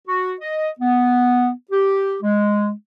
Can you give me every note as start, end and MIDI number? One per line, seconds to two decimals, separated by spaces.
0.07 0.34 66
0.41 0.69 75
0.80 1.49 59
1.71 2.16 67
2.21 2.71 56